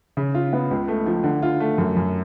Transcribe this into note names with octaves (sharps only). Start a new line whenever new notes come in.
C#3
F4
B3
C#2
A3
F3
D3
F4
A3
F#2
F#2